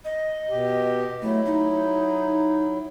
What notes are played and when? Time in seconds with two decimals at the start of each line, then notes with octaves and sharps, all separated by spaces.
0.05 D#5
0.50 B2 G4
1.22 F#3 A3 E4
1.45 D#4